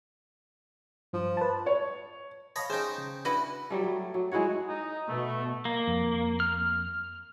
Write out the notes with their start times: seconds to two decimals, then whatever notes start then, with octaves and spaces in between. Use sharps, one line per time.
1.13 G2 F3
1.37 B4 A5
1.66 C#5
2.56 C#5 D#5 F5 A5 B5
2.70 C#4 D#4 G#4 C5 G5
2.98 C#3
3.25 D4 E4 F#4 B4
3.70 F#3 G3 A3
3.84 F#3
4.14 F#3
4.31 G#3 E4 F#4 C#5
4.69 D#4
5.08 B2 A3
5.65 A#3
5.87 F2
6.40 F6